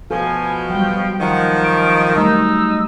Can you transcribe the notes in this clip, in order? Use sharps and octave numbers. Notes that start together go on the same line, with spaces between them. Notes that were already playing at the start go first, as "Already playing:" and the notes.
B2 F3 A4 G#5
F#3 G3 G5
D#3 F3 F#5
D7
F#3 G3 A3 D#4 E6